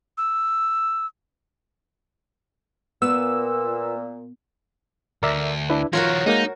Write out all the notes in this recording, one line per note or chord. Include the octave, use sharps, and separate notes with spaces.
E6
A#2 B3 E6
D2 A#4 D5 E5
D4 E4 B4
D#3 F3 F4 F#4 A#4 C#5
G#3 A#3 D#4 G6